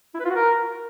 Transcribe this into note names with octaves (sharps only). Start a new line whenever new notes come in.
E4
B4
F4
F#4
A#4